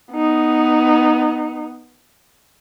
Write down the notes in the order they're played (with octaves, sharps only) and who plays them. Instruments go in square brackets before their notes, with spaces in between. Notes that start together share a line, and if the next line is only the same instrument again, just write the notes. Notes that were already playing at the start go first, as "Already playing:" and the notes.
[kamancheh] B3 D#4